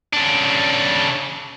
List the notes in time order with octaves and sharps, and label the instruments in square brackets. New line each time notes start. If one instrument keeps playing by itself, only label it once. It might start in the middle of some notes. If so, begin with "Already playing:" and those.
[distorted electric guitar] C#3 D4